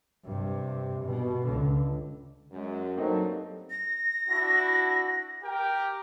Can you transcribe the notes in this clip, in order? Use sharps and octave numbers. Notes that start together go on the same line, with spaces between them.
G2 C3
B2
C#2 D3
F#2 G#3
G2 F#3 A3 A#3 C4 D#4
A#6
D4 E4 F#4
G4 A#4 G5